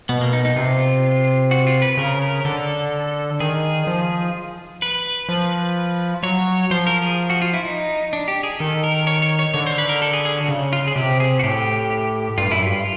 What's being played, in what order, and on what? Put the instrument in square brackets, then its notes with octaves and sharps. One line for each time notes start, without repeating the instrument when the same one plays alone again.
[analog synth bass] B2 [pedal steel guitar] B3
[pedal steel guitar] A#3
D#4
D#4
[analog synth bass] C3 [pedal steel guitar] F4
[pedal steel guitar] F#4
F4
B4
[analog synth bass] C#3 [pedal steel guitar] A#4
[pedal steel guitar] A#4
[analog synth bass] D3 [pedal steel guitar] A4
[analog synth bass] D#3 [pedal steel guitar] G#4
[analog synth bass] F3
[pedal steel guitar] B4
[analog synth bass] F3
[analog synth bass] F#3 [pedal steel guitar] C#5
[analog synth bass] F3 [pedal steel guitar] C5
[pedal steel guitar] A#4
G#4
F#4
F4
E4
D#4
D4
G4
G#4
[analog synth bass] D#3 [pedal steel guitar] A4
[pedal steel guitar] A#4
C#5
C#5
C#5
[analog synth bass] D3 [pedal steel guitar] C#5
[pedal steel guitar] C5
B4
A#4
A4
G#4
G#4
F#4
[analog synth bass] C#3
[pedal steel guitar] F4
G#4
[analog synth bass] C3 [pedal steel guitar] G4
[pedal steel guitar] G#4
F#4
[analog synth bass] A2 [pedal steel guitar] G4
[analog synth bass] G2 [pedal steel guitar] F4
[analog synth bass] F#2 [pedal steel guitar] E4
[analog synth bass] G2 [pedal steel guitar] F4